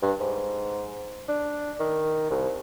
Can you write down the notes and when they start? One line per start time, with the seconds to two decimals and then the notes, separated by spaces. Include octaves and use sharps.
0.02 G2
0.20 G#2
1.29 D4
1.80 D#3
2.30 C2